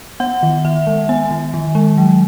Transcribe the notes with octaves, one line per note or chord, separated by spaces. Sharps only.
B3 F#5
D#3
D#3 E5
G#3
B3 G#5
D#3
D#3
G#3
F#3